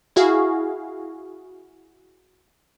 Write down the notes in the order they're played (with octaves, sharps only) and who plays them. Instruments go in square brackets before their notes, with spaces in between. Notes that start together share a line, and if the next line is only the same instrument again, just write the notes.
[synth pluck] E4 F#4 G#4 F5